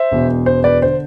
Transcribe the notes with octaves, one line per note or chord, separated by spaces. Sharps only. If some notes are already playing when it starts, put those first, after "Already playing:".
Already playing: C5 E5
E1 E2 B2
C5
B4 D5
D3 C5